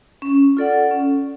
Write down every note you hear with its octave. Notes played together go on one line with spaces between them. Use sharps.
C#4
F4 A4 D5 F#5
C#4